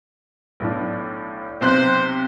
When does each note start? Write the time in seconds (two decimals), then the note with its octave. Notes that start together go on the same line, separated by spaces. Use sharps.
0.60 B1 A2 D4
1.61 B1 C3 C5 F#6